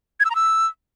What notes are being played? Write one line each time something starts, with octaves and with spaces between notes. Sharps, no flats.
G#6
E6
A#5
E6